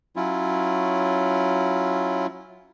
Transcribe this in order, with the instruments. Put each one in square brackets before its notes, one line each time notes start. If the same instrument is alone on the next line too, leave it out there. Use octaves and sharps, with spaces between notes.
[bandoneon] F#3 C#4 E4 F4